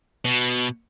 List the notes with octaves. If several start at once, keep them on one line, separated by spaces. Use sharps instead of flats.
B2